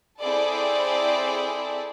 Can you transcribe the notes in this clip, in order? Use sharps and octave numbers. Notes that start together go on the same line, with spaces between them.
C4 E4 G#4 A4 D5